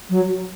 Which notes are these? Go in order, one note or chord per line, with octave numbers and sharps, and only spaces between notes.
F#3